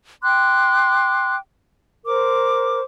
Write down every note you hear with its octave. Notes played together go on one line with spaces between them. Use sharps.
G5 C6 D6 F#6
A#4 C5 D6